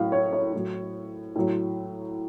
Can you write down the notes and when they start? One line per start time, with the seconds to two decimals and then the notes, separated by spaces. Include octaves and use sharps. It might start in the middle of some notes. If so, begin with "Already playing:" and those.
Already playing: A2 F#3 F5
0.12 C#5
0.33 C#5
0.53 A2 F#3
1.36 A2 F#3